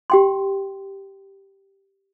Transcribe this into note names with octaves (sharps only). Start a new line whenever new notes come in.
G4 G5 C6